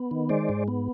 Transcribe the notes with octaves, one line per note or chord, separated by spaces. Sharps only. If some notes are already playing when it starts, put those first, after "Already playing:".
Already playing: B3
D#3
G#3 C5 D5
G#2
B3